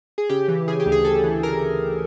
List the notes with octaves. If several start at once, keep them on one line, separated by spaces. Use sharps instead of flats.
G#4
C#3 G4
E3
C#3 G#4
G4
D2
G#4
D2 A4
E3
A#4